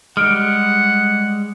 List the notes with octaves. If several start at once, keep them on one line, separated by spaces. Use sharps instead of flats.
G3 G#3 F#5 F6 D7